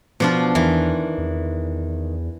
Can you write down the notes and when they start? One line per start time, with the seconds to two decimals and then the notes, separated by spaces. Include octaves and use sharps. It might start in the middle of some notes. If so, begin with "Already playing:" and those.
0.20 B2 F3 D4 F4
0.55 E2 D#3 E3
1.18 E2